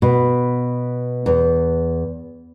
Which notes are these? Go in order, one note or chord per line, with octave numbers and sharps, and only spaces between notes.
B2
E2